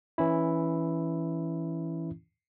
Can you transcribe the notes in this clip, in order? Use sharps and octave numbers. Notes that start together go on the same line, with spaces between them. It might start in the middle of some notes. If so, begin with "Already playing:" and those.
E3 C#4 E4